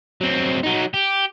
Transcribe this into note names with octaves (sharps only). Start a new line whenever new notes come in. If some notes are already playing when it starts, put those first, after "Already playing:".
F#3 C4
F#3 D#4
G4